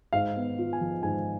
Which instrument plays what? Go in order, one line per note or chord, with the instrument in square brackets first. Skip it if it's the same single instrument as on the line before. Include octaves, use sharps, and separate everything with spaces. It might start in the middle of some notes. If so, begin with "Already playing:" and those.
[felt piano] G#2 [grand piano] F5
[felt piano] B3
F4
[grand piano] G#5
[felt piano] F3
[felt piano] G#2 [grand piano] G#5